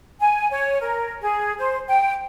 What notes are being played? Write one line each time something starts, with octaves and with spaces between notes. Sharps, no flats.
G#5
C#5
A#4
G#4
C5
G5